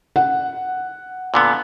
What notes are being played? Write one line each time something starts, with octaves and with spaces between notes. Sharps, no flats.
F#5
A#2 D3 B3